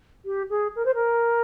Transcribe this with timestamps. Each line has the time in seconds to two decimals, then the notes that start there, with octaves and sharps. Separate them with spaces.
0.25 G4
0.50 G#4
0.76 A#4
0.85 C5
0.94 A#4